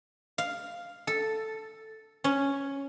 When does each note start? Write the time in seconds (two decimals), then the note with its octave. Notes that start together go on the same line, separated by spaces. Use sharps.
0.38 F5
1.07 A4
2.24 C#4